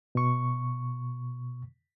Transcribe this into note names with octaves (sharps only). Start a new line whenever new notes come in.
B2 C#6